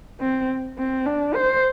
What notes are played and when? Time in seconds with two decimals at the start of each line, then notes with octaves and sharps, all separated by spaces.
0.21 C4
0.78 C4
1.06 D4
1.35 C5